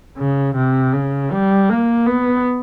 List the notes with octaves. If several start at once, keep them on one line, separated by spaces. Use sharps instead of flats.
C#3
C3
C#3
G3
A#3
B3